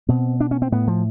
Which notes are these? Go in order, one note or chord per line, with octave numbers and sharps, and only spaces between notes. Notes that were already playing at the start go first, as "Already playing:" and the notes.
B2 C4
D4
C#4
C4
A2 B3
F3